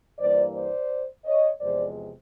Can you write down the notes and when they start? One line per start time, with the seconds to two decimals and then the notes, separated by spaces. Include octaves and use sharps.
0.19 G2 E3 G3 A#3 C5 D5
0.54 C5 D5
1.25 C#5 D#5
1.61 E2 C3 F3 G#3 C5 D5